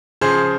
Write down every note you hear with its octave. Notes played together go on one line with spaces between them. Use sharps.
C#3 F3 G#4 C5